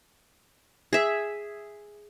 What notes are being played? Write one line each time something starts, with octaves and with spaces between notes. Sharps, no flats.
G#4 E5